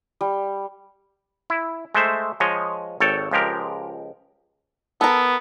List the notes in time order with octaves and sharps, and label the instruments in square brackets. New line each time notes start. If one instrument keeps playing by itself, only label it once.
[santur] G3
[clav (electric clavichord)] E4
G#3 A3 C5 E5
F3 G#3 C#5 D#5 G#5
G#1 A4 C#5 G5 A5
C#2 F3 G#3 G4 A#4
[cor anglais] B3 [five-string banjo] A4 A#4